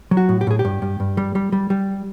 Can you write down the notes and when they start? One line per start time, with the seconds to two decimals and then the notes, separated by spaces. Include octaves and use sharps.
0.11 F#3
0.17 F#4
0.29 A2
0.41 G4
0.47 A2 G#4
0.59 G4
0.65 G2
0.82 G2
1.00 G2
1.17 G3
1.35 G3
1.52 G3
1.70 G3